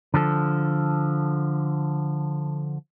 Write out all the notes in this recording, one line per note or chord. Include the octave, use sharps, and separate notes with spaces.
D3 F3 A4